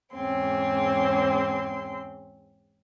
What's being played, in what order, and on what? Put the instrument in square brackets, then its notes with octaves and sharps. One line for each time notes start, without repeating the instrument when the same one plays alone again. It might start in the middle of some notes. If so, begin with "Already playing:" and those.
[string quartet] E2 G#2 C4 C#4 C6